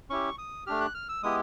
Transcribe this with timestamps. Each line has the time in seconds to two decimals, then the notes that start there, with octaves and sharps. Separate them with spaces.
0.10 C#4 E4 G4 C#6
0.38 D#6
0.67 A3 D4 G4 F6
0.80 F#6
0.95 F6
1.09 E6
1.23 G#3 B3 E4 G4 D#6